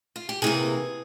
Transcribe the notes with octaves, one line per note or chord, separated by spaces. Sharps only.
F4
G4
C3 E3 A#3 G#4